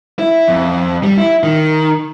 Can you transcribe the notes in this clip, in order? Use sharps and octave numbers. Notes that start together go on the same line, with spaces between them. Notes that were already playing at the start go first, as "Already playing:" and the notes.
E4
F2
G3
E4
D#3